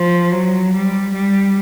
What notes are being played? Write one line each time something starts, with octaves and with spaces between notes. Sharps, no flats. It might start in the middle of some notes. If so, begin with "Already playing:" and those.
Already playing: F3
F#3
G3
G3